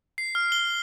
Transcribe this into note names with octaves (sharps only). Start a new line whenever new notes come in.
C7
F6
G7